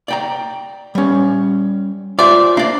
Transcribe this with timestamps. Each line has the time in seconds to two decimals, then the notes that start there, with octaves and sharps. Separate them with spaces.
0.08 D5 G5 A#5
0.95 G3 C#4
2.19 F4 C5 D5 E5
2.57 A#3 D4 D5